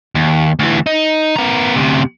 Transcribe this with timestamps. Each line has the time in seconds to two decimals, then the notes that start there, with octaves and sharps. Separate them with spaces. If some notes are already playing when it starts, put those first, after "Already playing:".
0.15 D#2
0.59 D2 E3
0.86 D#4
1.36 B3 A#4
1.76 D2 C3